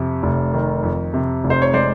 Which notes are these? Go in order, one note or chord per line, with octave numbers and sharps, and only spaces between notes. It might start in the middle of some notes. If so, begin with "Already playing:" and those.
Already playing: F2 C3
F1
D#3
F2
C3
F1
C5
C#5
G#3 C5 D5